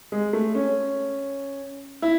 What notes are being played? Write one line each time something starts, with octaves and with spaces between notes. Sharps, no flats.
G#3
A3
C#4
E4